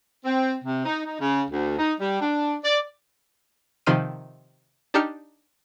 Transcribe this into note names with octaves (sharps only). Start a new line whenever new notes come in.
C4
C3
D#4
D#4
C#3
D2
D#4
G3
D4
D5
C3 D#3 F3 C6 F6 D#7
D4 D#4 G4 F6 C#7